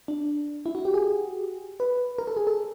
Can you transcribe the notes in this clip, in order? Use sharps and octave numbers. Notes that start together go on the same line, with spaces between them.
D4
E4
F#4
G4
G#4
B4
A#4
A4
G#4
A4